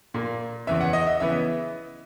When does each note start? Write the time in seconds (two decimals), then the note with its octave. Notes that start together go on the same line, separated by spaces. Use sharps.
0.14 A#2 A#3
0.67 E2 C#3 E3 B3 E5
0.81 F#5
0.93 D#5
1.07 E5
1.20 C#3 E3 B3 E5